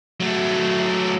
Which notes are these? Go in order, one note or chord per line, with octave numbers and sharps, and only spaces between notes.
F#3 A3